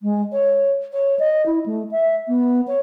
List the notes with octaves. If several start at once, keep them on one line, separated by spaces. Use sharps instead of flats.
G#3
C#5
C#5
D#5
E4
A3
E5
B3
C#5